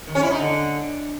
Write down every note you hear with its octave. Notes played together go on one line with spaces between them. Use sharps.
D#3
C#4
E4
D#4
D3